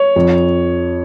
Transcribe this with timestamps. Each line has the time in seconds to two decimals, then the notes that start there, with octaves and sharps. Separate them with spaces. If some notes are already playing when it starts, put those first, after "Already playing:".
Already playing: C#5
0.16 F2